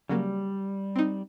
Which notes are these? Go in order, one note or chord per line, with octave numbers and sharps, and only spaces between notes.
C#3 F#3 G3 A#3
C4 D#4